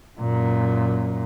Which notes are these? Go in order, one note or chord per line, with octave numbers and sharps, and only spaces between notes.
F#2 A#2